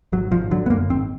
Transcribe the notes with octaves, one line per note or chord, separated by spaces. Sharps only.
G#1 F#3
G#1 F3
D3 F#3
B3
F#2 A#3
G#1 C4